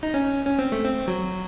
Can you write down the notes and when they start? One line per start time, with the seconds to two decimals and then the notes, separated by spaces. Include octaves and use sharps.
0.03 D#4
0.14 C#4
0.45 C#4
0.59 C4
0.72 A3
0.85 C4
1.08 F#3